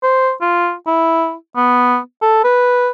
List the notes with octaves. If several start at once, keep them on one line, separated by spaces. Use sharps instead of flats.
C5
F4
E4
B3
A4
B4